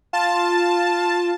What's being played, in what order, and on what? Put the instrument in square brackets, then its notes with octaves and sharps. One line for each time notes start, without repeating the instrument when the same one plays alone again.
[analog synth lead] F4 [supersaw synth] A5